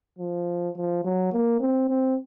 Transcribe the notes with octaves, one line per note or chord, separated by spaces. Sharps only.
F3
F3
F#3
A#3
C4
C4